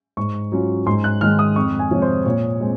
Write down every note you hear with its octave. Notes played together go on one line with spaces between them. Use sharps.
G#2 C#6
F#3 C#4 F4
G#2 C6
F#6
D#3 G#3 D#4 F6
D#6
F2 C#6
G#5
C3 F3 G#3 C#5
C5
A#2 C#5
G#3 C4